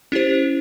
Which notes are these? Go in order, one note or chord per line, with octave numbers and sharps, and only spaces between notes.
C#4 E4 G4 C5